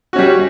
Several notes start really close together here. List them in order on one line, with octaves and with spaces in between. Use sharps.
F#4 C#4 G3